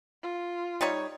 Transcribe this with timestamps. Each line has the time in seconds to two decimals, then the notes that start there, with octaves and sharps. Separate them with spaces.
0.23 F4
0.81 G3 D#4 C#5